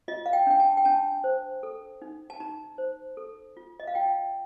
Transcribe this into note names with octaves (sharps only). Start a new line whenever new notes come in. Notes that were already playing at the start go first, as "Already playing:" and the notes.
F4 D#5
F5
G5
D4 G5
A5
G5
D4 A5
C5
A4
D#4
A5
D#4 A#5
C5
A4
F4
D#5
F5
F4 G5